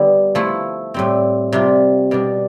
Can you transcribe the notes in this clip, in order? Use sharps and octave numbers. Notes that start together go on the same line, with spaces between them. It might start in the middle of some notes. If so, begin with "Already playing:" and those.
Already playing: D3 G3 B3
F3 A3 E4
A2 G3 C4
C3 G3 D4 F4
B2 G3 D4